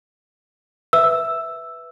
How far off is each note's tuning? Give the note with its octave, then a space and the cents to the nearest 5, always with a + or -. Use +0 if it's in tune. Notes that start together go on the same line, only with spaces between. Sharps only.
B4 +0 E5 +0 E6 +5